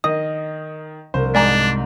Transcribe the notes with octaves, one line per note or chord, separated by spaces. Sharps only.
D#3 D#5 D#6
C2 C5
G#2 D4 D#4 D5 G#5 A#5